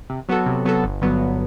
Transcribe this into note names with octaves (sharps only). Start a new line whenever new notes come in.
C3
F#3 B3 F#4 A4
C3
F#3 B3 F#4 A4
G1
G2 D3 F#3 B3
G1